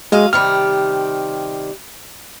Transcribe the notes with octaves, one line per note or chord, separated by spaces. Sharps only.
F#3 G#3 D#5 F5
C3 D#3 G3 F6